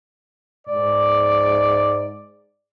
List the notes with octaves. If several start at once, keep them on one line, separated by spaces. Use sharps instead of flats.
G#2 D5